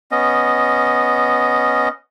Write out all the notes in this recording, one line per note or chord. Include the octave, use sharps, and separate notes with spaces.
B3 C#4 D#5